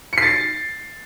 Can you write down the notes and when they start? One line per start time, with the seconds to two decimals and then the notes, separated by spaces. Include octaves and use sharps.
0.13 C#7
0.18 C7
0.22 A6